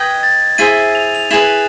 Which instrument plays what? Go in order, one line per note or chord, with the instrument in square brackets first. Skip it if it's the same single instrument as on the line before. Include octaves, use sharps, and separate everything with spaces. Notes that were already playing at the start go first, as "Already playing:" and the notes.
Already playing: [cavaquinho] B4 D#5 G5 [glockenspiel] G#6
[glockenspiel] A6
[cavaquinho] E4 G#4 C5 E5 [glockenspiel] D#7
[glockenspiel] F7
F7
[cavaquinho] E4 G#4 B4 [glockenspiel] E7